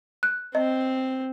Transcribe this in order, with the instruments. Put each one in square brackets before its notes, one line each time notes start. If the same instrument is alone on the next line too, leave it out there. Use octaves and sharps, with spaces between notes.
[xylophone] F#6
[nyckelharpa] C4 [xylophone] D#5